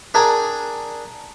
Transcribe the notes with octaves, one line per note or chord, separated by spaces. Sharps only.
D4 G#4 A#4 D5 G5 G#5